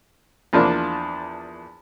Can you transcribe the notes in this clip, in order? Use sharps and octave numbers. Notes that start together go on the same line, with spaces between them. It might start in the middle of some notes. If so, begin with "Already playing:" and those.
E2 F3 A#3 D4